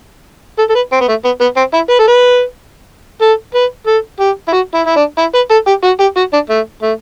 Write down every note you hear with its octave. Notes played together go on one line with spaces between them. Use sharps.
A4
A4
B4
C4
B3
A3
B3
B3
C4
E4
B4
A4
B4
A4
B4
A4
G4
E4
F#4
E4
E4
D4
E4
B4
A4
G4
F#4
G4
F#4
D4
A3
A3